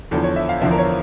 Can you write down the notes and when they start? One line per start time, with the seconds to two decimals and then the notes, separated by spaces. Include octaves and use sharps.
0.11 E2 D3 F3 A4
0.24 C#5
0.36 E5
0.49 F5
0.61 E2 D3 F3 E5
0.71 A#4
0.78 C#5